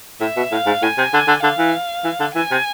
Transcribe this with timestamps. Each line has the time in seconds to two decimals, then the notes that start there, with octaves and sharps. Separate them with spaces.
0.21 A2 E5
0.36 B2
0.52 A2 F5
0.66 G#2
0.82 A2 G#5
0.98 C3
1.13 D3
1.28 D3
1.43 D3 F5
1.58 E3
2.04 E3
2.20 D3
2.35 E3 G#5
2.51 C3